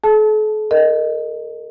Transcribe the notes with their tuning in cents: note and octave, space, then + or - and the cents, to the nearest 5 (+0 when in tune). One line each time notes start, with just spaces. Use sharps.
A4 -45 A5 -15
A#4 +0 D#5 -5